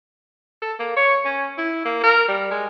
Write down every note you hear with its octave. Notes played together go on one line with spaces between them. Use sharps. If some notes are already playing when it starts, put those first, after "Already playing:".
A4
A#3
C#5
C#4
E4
A#3
A#4
G3
G#3